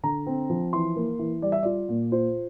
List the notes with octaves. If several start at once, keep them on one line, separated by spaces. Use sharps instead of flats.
D3 A#5
C4
F3
E3 C6
A#3
E3
G3 D5
E5
F4 D5
A#2
F4 C5